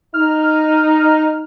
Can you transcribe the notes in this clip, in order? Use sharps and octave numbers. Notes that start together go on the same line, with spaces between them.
D#4 F6